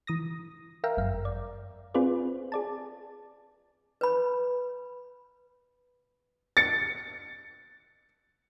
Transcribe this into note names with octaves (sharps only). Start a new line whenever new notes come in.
E3 D#6 A#6
A#4 E5 F5 G5 A#5
G1 F#2 F5
D5
C4 F4 G#4 B4 C5 D5
G#4 D5 A5
B4 B5
A6 C#7